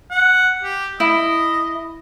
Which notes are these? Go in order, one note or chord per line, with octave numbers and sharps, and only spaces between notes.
F#5
G4
E4 D#5